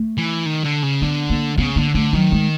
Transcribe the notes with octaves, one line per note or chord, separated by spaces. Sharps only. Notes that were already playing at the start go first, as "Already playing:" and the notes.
Already playing: A3
E3
D#3
D3
C#3
D3 B3
A#3
C#3 B3
D3 A#3
D3 A3
D#3 F#3
G#3